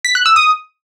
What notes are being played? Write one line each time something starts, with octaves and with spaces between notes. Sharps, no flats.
B6
F#6
E6
D#6